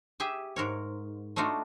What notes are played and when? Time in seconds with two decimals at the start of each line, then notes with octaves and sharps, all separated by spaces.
0.20 G4 G#4 E5
0.56 G#2 A#4 C#5
1.36 A3 D4 D#4 F4 F#4